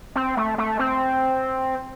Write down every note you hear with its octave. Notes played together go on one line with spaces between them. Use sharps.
C4
A3
A3
C4